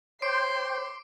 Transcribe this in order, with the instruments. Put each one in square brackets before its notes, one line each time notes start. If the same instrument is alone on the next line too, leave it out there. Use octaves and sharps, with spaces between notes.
[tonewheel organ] C5 G5 [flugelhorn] C#5 [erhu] C6 [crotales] D6 C7 D7